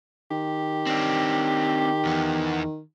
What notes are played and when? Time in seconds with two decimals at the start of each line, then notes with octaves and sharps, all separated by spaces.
0.31 D#3 G4
0.87 C4 D4
2.05 E2 B3